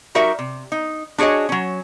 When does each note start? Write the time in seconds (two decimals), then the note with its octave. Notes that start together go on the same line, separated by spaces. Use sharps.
0.15 G3 D#4 F#4 A#4 E5
0.39 C3
0.72 D#4
1.18 D4 F#4 G#4 C#5 D#5
1.49 F#3 C#4